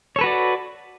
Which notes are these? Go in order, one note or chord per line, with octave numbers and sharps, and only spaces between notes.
F#4 A4 B4 C#5 D5